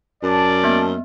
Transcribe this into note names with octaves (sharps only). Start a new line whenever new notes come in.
F#2 D5 A5
A#3 B3 E5